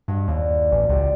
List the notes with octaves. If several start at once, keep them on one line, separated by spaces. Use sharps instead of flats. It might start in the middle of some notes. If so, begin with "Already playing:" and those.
G2 F#4 D#5
D#2 D4 D5
D5
A1 F#3
C#2 G4 D5